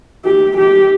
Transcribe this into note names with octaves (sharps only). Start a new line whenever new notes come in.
G4
G4